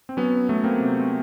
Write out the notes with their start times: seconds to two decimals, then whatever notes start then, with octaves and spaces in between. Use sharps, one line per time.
0.09 C4
0.17 F#3 B3 C#4
0.49 F#3 A3 B3
0.64 A#3 C4
0.81 C3